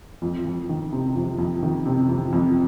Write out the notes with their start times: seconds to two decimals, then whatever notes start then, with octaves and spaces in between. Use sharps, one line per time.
0.22 F2
0.45 F2
0.69 D#3
0.92 C3
1.16 F2
1.39 F2
1.63 D#3
1.86 C3
2.09 F2
2.33 F2